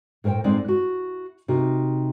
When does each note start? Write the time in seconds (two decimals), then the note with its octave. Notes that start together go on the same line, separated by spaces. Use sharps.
0.24 A2 A#4 C5 F5 G5
0.44 A2 G#3 C4 D#4 D5 F#5
0.65 E4 F#4
1.48 C3 D#4 F#4 A#4